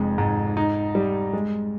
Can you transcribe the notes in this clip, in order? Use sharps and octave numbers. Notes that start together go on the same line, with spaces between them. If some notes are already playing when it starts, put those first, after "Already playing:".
Already playing: F1 F2 G#3
G#2
D#4
G3
G#3